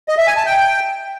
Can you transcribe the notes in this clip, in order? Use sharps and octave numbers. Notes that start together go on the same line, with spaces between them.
D#5
E5
G#5
A5
G5